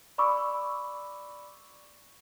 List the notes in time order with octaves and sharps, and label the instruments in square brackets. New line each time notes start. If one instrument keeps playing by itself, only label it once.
[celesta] D5 B5 C#6 D6 E6